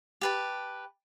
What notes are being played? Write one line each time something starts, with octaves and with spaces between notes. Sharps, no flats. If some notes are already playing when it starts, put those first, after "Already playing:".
G4 B4 A5